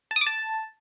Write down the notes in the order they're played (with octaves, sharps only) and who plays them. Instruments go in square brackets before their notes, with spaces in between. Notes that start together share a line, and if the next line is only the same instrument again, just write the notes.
[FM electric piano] A5
D#6
D6
A5